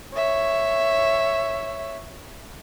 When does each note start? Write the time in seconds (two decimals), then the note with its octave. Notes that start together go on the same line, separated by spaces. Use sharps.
0.14 C#5 E5